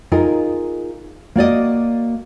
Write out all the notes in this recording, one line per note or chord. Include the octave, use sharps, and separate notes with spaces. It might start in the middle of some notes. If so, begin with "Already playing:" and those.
D#4 F4 G#4 A#4
A#3 F#4 D5 D#5